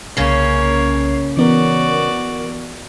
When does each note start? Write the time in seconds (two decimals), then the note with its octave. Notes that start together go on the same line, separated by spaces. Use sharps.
0.17 C2 C#3 A#3 C#4 C#5 C7
1.37 E3 B3 F#4 A#4 D5